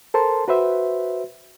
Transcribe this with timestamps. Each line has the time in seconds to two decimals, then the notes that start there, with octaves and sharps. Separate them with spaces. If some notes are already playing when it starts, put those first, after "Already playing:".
0.14 A4 A#4 C5 A5 C6
0.48 F#4 B4 C5 E5